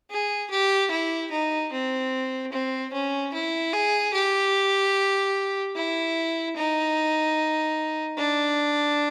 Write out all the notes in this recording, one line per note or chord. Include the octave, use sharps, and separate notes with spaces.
G#4
G4
E4
D#4
C4
C4
C#4
E4
G#4
G4
E4
D#4
D4